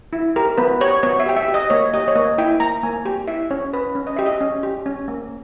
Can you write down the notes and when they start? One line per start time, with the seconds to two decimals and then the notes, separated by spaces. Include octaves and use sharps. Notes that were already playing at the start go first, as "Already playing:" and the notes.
0.13 E4
0.36 G4 A#4
0.57 B3 B4
0.80 G4 C#5
1.03 B3 C#5
1.20 E5
1.26 G4 G5
1.37 E5
1.48 G4
1.54 D#5
1.70 A#3 C#5
1.94 G4 D#5
2.08 C#5
2.15 A#3 D#5
2.38 E4 G5
2.60 A#3 A#5
2.83 A#3 G#5
3.05 G4
3.28 E4 E5
3.51 C#4 C#5
3.73 C#4 B4
3.95 C#4
4.07 D#5
4.16 G4 E5
4.26 D#5
4.41 C#4
4.63 G4
4.86 C#4
5.08 A#3